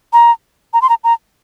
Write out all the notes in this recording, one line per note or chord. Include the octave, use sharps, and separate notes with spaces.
A#5
A#5
C6
A#5
A#5